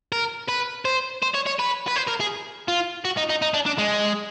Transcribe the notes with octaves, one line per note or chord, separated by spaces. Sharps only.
A#4
B4
C5
C5
C#5
C#5
B4
B4
C5
A#4
G#4
F4
F#4
D#4
D#4
D#4
D4
D4
G#3